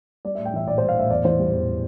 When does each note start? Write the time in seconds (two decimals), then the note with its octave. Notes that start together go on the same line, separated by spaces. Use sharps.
0.25 G3 D5
0.35 A2 E5
0.45 G5
0.53 E3 E5
0.67 A#1 D5
0.78 G3 C5
0.89 F5
0.96 A2 E5
1.10 E2 D5
1.25 E3 C5
1.39 G3
1.53 E2